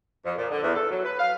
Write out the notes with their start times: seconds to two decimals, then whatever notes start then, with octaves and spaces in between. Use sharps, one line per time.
0.24 F2
0.36 A#2
0.49 D3
0.62 E2
0.75 A4
0.90 F#3
1.04 B4
1.19 F5